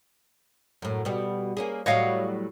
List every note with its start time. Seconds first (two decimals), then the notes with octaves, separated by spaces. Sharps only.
0.82 F#2 A2
1.05 B2 G3
1.57 A#3 C#4 G#4
1.86 A2 F#3 G3 C#5 D#5 F5